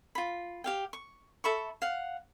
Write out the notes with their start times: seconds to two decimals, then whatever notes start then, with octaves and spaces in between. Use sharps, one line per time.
0.15 F4 B5
0.64 G4 F5 G5
0.93 C#6
1.44 A4 E5 B5 C#6
1.82 F5 F#5